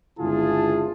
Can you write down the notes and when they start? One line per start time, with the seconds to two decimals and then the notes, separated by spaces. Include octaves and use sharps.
0.19 G1 C#2 E4 F4 G#4 A5